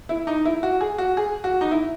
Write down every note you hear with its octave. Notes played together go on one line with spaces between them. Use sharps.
E4
D#4
E4
F#4
G#4
F#4
G#4
F#4
D#4
E4